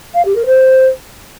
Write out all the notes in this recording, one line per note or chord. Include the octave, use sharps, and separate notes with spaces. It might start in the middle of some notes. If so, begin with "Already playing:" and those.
F5
G4
A#4
C5